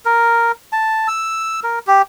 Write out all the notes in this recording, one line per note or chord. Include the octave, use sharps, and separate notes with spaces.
A#4
A5
E6
A#4
G4